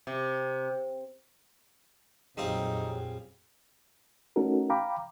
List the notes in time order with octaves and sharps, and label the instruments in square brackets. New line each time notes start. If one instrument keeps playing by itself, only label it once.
[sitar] C3
[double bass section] A#1 F2 F#3 [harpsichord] G3 C4 F4 [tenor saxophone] D#4 [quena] G#4
[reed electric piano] A3 C#4 D#4 F#4 A4 A#4
F5 G5 A#5 B5 D6